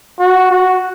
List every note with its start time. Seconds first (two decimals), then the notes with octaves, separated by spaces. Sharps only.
0.20 F#4
0.51 F#4